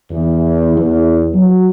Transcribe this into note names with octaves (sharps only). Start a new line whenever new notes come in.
E2
E2
F#3